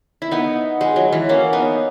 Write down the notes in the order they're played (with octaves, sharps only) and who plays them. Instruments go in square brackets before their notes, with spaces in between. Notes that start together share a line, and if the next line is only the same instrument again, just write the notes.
[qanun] E4
B3 D#4
G#3
F#3
E3
A#3 C#4
B3 D#4